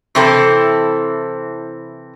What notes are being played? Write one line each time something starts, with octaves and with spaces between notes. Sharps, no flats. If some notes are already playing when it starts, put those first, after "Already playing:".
C3 E3 C4 E4 A4